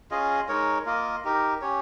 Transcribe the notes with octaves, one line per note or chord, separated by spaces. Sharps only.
C#4 F4 G#4 D#5
G#3 D#4 A#4 C#5
A#3 F4 A#4 D#5
D#4 G4 A#4
C#4 G4 C#5